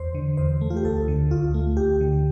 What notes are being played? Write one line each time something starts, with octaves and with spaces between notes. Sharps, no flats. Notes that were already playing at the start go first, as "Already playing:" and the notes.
Already playing: E2 C5
D3
E2 C5
A3
F4
G4
D2 A4
D3
D2 F4
A3
D2 G4
D3